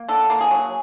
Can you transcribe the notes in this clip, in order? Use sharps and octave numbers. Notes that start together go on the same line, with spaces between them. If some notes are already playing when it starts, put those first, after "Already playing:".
Already playing: A#3
D3 A4
A#3
G#4
F#3